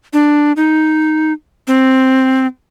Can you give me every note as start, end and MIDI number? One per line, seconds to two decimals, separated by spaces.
0.13 0.52 62
0.57 1.33 63
1.67 2.46 60